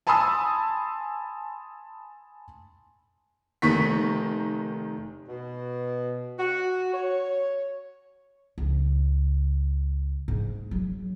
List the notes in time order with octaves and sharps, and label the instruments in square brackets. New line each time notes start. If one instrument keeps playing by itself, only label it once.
[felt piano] G#5 A5 B5 C6 D#6 E6
[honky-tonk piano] F1 D#3 C#6 B6
[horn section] B2
F#4
C#5
[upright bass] C#2
G#2
F#3